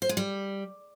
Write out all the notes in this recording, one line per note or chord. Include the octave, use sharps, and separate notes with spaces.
C5
G#3
G3